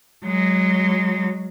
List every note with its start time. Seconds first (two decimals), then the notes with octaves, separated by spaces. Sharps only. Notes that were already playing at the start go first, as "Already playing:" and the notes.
0.25 F#3 G#3